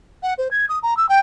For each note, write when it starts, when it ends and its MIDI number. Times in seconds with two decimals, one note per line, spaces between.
0.23 0.34 78
0.38 0.48 72
0.51 0.65 92
0.69 0.79 87
0.83 0.97 82
0.97 1.08 88
1.09 1.19 79